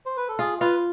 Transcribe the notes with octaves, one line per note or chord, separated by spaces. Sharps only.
C5
B4
A4
F4 G#4
F4 B4